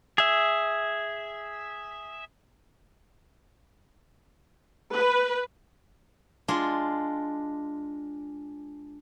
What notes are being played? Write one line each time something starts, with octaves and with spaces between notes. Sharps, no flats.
G#4 E5
B4
G#3 D4 F4